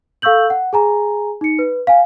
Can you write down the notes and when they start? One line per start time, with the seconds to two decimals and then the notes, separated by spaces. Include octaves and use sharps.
0.22 A4 F5 C#6 E6 G6 F#7
0.50 F#5
0.73 G#4 G#5 A#5
1.41 D#4 C#7
1.59 B4
1.87 F5 G#5